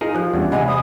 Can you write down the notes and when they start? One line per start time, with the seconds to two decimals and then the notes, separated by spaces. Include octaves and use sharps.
0.01 D#4 F4 G#4 A#4
0.15 F3 G4 F#6
0.34 E2 G3 C#4 D4
0.52 C3 G#3 D#5 E5 F#5 G#5 B5
0.68 C3 D5 B5 D#6